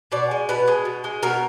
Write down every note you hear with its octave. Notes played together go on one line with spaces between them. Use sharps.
B2 D5
G#3
B2 B4
G#3
B2
G#3
B2 A#4